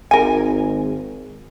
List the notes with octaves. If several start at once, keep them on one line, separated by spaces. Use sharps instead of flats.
G#1 A#4 G#5